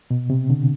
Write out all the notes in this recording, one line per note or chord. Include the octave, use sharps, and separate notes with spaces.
B2
C3
D3